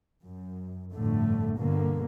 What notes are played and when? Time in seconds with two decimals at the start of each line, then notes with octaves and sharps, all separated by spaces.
0.24 F#2
0.95 G1 F2 A2 D3 A3
1.58 G2 B2 D3 A#3